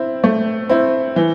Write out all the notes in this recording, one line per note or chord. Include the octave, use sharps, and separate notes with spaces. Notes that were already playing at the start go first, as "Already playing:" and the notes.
Already playing: C4 E4
A3
C4 E4
E3